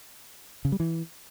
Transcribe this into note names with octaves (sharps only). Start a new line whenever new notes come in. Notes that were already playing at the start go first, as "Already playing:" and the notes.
C#3
G3
E3